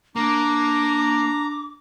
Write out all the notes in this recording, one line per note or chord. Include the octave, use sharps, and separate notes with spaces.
A#3 D4 A#5 D6